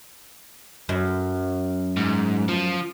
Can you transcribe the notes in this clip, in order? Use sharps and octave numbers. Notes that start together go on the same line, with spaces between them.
F#2
G#2
F3